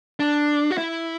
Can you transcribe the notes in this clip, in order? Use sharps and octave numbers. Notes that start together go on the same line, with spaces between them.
D4
F#4
E4